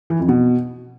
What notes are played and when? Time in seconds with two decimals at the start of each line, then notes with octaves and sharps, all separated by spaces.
0.10 E3
0.19 F2
0.29 B2